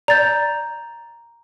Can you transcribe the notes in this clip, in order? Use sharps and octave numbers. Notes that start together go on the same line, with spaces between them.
D5 A#5 G6 A6